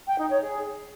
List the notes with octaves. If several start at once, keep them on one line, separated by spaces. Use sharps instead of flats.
G5
D#4
C#5
G#4